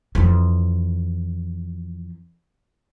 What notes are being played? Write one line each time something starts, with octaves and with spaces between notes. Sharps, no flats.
F2 E3